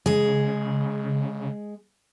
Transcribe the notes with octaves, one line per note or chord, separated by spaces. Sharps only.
C#3 G#3 G#4